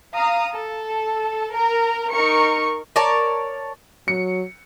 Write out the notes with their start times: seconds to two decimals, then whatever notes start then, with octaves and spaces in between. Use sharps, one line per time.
0.16 F5 A#5 D#6
0.54 A4
1.54 A#4 A#5
2.12 D#4 A#4 C#6 C#7
2.96 A#4 C#5 D5 A5
4.08 F#3 C#7